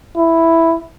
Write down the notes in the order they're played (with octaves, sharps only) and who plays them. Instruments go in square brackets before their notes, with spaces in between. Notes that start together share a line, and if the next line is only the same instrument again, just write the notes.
[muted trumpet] E4